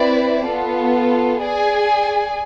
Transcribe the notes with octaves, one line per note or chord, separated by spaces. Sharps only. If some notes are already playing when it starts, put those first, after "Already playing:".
Already playing: C4 E4 B4 D5
B3 F4 A4
G#4 D5 G#5